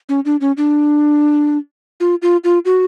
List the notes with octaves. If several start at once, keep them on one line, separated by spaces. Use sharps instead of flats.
C#4
D4
C#4
D4
F4
F4
F4
F#4